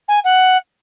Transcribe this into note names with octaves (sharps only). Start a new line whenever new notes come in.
G#5
F#5